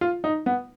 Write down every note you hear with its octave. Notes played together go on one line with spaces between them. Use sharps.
F4
D#4
B3